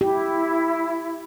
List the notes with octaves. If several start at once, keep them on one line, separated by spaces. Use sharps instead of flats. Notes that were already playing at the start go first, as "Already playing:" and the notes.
E4 G4